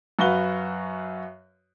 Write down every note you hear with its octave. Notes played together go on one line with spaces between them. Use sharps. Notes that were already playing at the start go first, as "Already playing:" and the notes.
F#2 F#4 B4 F5 G7